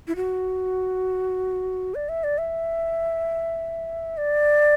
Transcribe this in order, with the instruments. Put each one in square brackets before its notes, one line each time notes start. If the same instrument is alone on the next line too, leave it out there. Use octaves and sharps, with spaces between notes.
[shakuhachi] E4
F#4
D5
E5
D5
E5
D5